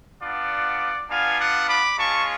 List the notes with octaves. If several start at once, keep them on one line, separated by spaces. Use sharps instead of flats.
B3 D4 F4 D5 F#5
B3 D4 F4 F5 G#5
D5 F#5
B5 D6
G#3 C#4 F4 A5 C#6